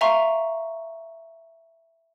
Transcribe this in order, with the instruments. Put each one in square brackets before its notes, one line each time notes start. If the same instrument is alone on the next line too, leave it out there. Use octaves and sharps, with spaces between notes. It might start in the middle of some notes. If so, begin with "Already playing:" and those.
[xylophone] E5 F5 G#5 A#5 C6 C#6